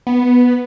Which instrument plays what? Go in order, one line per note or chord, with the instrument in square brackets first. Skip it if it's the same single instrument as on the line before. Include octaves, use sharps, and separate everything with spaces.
[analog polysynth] B3